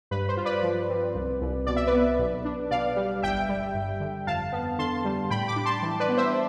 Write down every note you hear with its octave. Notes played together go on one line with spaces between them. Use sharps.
G2 B4
C5
F4
B4 D5
F3
C4
C2
C2
B2 D5
E5
B4 D5
B3
B1
D4
B2 D5 F5
G3
G1 E5 G5
G3
G2
D3
F2 F5 A5
B3
D3 A5 C6
G3
A2 G5 B5
B5 D6
D4
A5 C6
E3
B4 D5
B3
C5 E5